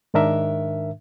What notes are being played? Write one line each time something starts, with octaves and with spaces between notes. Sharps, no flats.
G#2 D#3 D4 A#4 E5